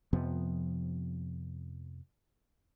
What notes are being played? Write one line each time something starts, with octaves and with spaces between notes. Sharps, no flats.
F2 C3 F3 B3